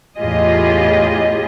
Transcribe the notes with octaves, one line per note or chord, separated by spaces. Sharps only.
E2 A2 F4 G4 G#4 D#5